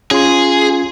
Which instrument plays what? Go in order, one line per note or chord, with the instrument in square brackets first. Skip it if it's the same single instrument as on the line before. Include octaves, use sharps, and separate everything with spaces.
[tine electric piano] C#4 F4 C6 [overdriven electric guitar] G#4